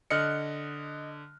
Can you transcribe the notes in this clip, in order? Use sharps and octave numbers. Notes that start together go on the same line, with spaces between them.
D3 D#5 F6 F#6 C#7